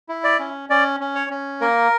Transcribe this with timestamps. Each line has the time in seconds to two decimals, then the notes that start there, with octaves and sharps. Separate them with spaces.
0.09 E4
0.24 D5
0.39 C#4
0.70 C#4 D5
1.00 C#4
1.15 C#5
1.30 C#4
1.61 A#3 A#4